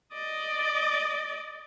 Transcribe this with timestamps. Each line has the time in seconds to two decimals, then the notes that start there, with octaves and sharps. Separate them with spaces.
0.13 D5 D#5